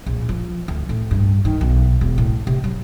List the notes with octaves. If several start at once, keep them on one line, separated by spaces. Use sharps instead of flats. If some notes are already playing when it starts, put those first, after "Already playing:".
A#1
F3
D2
A2
G2
D#3
B1
E1
A2
C3
F#3